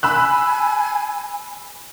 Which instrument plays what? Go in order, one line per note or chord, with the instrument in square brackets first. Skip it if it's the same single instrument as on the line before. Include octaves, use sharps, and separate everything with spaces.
[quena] G#5 [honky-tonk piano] B5 E6 F#6